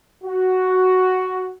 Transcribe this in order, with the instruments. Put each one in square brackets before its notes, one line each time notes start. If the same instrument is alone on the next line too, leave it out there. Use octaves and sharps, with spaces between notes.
[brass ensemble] F#4